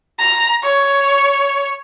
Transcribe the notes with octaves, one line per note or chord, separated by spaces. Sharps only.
A#5
C#5